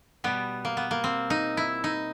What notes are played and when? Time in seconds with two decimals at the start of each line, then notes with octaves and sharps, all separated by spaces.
0.24 B2 G3 B3
0.65 A#3
0.77 B3
0.91 A#3
1.04 C4
1.30 D#4
1.57 E4
1.84 D#4